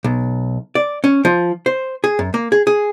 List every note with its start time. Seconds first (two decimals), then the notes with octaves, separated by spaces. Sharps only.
0.04 B1
0.75 D5
1.04 C#4
1.25 F3
1.66 C5
2.04 G#4
2.19 F#2
2.34 A#3
2.52 G#4
2.67 G#4